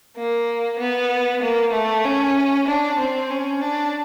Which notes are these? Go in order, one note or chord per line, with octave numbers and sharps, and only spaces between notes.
A#3
B3
A#3
A3
C#4
D4
C4
C#4
D4